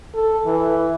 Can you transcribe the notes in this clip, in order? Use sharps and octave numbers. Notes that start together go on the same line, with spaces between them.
A4
E3